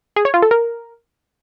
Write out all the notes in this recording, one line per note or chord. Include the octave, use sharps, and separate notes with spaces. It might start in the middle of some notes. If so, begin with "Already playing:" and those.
G#4
C#5
F4
A4
A#4